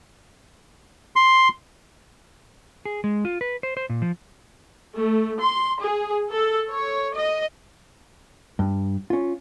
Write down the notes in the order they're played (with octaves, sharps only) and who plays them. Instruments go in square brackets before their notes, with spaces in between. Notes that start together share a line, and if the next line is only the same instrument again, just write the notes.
[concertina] C6
[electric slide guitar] G#4
G#3
F4
B4
C5
C5
A#2
F3
[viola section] A3
C6
G#4
A4
C#5
D#5
[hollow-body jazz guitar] G2
C#4 F4